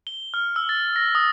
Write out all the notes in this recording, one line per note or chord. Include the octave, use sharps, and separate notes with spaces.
G7
F6
E6
A6
A#6
D#6